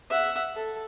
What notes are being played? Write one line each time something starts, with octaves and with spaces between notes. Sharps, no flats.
E5 F#5
A4